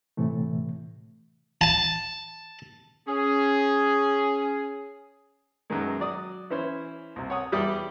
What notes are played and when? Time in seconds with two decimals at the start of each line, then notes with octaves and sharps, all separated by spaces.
0.17 A2 C3 E3 A3
1.61 A5
3.08 C#4 G#4
5.70 F#2 B2 D#3 G#3
6.00 F#3 D5 D#6
6.50 E3 C#4 E4 C5
7.16 C2 C3
7.30 C#5 F#5 D#6
7.52 E2 G3 E4 G4 D#6